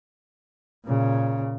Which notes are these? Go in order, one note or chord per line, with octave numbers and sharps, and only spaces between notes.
A#2 C#3